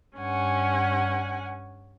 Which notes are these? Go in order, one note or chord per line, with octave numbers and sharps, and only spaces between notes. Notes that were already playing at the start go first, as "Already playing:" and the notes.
G2 C#4 F#5 G#5